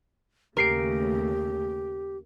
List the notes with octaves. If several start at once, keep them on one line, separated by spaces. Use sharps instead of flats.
D#2 C#3 A3 G4 A#4 C7 D7